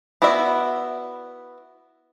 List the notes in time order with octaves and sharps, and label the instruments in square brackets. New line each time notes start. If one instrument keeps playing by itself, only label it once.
[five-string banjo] B3 E4 F#4 D5 E5